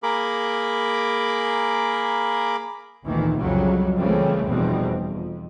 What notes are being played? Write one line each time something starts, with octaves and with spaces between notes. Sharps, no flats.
A#3 G#4 A#4 B5 D6
G#1 D2 A#2 D#3 E3
C2 F2 C#3 F#3 G3
C#2 C#3 E3 G3 A3 C4
F1 E2 B2 G3 C4
F2